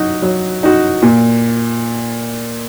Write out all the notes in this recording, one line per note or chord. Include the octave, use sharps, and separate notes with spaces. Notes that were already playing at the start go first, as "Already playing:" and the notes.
Already playing: F#3 D#4 F#4
F#3
D#4 F#4
A#2